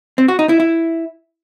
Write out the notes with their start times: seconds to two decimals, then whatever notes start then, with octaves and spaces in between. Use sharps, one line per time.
0.18 C4
0.28 F#4
0.39 D#4
0.49 E4
0.60 E4